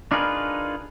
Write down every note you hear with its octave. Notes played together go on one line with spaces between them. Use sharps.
D4 D#4 F4 G#4 A#4 B4